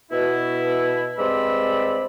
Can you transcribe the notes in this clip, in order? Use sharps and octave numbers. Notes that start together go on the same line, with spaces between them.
B2 E4
G2 G#3 C4 D5 B5 E6